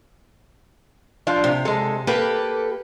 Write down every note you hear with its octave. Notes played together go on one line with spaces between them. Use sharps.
F3 D4 F4
C3
G#3 A4
A#3 G4 A4 B4